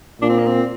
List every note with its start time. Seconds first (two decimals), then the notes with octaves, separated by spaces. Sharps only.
0.22 A#2 D4
0.29 C4
0.39 A#3
0.47 C4